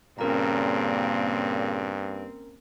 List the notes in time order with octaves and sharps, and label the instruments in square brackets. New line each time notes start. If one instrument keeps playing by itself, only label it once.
[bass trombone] G2 [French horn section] A#2 C#3 [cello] A#3 C4 [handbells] C#4 A#4 A#5